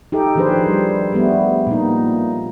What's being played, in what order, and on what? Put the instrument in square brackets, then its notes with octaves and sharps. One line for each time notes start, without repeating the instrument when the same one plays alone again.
[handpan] D#4 G4 A4
D#3 F3 D4 G#4 B4 C5
G3
G3 A3 B3
A#2 A#3 D#4